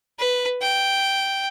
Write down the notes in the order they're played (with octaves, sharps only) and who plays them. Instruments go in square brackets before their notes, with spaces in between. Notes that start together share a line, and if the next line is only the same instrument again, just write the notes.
[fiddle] B4
G5